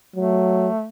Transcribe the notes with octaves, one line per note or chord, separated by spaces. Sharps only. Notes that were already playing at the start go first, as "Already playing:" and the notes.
F#3 A3